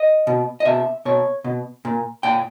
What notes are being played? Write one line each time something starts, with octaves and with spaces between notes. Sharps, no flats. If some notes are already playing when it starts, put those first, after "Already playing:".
Already playing: D#5
B2
D#5
B2 E5
B2 C#5
B2
A#2
A#2 G5